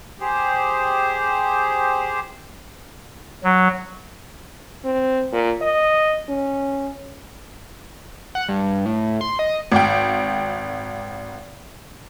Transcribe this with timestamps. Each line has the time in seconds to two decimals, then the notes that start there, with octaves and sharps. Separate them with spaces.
0.20 G4 G#4 C5
3.44 F#3
4.84 C4
5.32 A#2
5.62 D#5
6.29 C#4
8.35 F#5
8.49 G2
8.86 A2
9.21 C6
9.39 D#5
9.72 G#1 G5